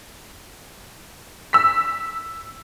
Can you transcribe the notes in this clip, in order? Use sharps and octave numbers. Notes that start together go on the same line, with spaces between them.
E6 B6